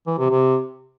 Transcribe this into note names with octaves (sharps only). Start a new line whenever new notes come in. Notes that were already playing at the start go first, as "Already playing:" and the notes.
E3
C3
C3